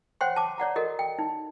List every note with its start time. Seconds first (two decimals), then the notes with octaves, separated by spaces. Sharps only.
0.21 C5 C#5 F#5 G5 C6
0.36 A5 D6
0.58 C#5 D5 F#5 A#5
0.76 F#4 A4 A#4 D#5
0.99 G5
1.19 D#4